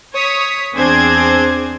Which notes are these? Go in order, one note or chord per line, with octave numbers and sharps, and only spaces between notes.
C#5 D#6 B6
E2 C4 D4 G#4 C5 G#6